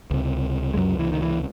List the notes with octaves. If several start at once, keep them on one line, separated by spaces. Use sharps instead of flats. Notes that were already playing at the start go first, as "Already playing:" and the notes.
C#2 C3
G#3
F#2 F#3
E3
D#3
E3